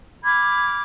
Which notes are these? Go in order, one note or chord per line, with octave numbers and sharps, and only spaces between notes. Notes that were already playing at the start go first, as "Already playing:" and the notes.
B5 D6 F6 G#6